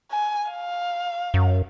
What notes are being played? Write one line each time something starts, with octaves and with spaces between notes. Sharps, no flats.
G#5
F5
F#2